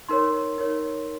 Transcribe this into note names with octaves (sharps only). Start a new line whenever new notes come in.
D#4 A#4 C#5 C6
D#4 A#4 C#5